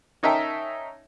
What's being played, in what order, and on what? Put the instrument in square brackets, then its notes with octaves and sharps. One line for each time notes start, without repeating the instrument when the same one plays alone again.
[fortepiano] C#4 D#4 A#4 E5 G5 A5